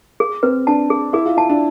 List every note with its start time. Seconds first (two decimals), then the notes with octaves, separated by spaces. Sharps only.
0.20 G#4
0.43 C4 B4
0.67 D4 A5
0.90 G#4
1.13 E4 G#4
1.25 F4
1.37 E4 A5
1.49 D4